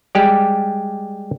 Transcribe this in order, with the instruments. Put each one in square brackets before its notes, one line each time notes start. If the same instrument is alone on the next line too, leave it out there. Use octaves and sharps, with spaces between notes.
[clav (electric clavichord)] G3 G#3 G4 D5